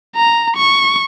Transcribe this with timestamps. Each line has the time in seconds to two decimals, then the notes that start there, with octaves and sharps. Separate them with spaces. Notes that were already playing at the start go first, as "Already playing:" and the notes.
0.15 A#5
0.56 C#6